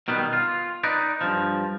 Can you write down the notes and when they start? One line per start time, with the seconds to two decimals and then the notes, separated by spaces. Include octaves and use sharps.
0.08 B2 D#3 G3 B3
0.33 F4
0.83 D#4 B4 D5
1.21 G2 F3